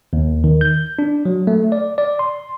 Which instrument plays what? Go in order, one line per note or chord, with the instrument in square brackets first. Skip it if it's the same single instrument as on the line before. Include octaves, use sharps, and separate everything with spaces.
[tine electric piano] D#2
D#3
G6
D4
F#3
A3
D5
D5
C6